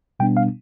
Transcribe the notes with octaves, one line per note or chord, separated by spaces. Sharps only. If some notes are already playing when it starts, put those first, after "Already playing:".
B2 G3 B3 D4 G5
F5